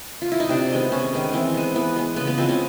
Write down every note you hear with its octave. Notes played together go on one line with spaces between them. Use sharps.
F4
E4
D#4
C3 D4
D#3 G#3 B3
C3 C#4
D#3 G#3 B3
E3 C4
G#3 B3
E3 B3
G#3 B3
C#3 B3
B3
F3 G#3 B3 C4
C#4